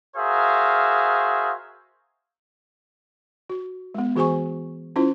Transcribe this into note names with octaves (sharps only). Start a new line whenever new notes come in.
F#4 G#4 A#4 C5 E5 F5
F#4
G#3 B3
E3 F#4 G#4 C5 G#5 C#6
C#4 E4 F4 C5